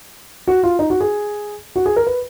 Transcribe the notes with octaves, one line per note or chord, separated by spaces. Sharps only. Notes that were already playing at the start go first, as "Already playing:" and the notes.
F#4
F4
D#4
F#4
G#4
F#4
G#4
A#4
B4